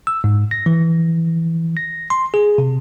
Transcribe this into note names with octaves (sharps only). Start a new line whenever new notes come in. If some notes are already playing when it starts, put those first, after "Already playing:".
E6
G#2
A#6
E3
A#6
C6
G#4
C3